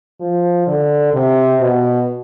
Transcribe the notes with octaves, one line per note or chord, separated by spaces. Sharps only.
F3
D3
C3
B2